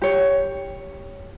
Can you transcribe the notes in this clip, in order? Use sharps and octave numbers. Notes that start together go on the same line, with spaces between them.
G4 C#5